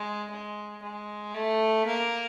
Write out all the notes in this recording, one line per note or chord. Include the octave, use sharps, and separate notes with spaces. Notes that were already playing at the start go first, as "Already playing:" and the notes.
Already playing: G#3
G#3
G#3
A3
A#3